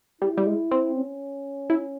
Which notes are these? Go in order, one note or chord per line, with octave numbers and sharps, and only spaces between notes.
G3 E4
G3
G#3
C4
C#4
E4